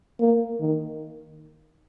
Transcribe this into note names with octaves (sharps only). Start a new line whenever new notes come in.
A#3
D#3